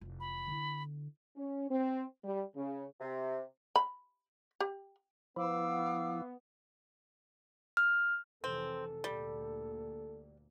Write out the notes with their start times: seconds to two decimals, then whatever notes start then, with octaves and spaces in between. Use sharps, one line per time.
0.01 F1 E3
0.20 B5
0.48 D3 B3 E4
1.36 C#4
1.69 C4
2.23 G3
2.55 C#3
3.01 C3
3.76 B5
4.60 G4
5.36 F3 B3 E4 F5 D6 E6
7.77 F6
8.44 F1 C3 E3 C4 A4
9.04 D2 A#2 G3